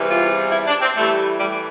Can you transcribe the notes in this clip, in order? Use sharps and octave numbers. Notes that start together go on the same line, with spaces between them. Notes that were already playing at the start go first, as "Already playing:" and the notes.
Already playing: E2 C3 E3 G3
F4
E4
D4
C4
A2 E3 G3 A3
G3